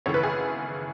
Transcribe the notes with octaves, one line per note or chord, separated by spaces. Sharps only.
G#1 F#2 C#3 E3 A3 C#5
B4
G#4